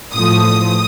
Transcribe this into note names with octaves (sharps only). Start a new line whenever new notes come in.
A2 F3 A3 D#6
D#6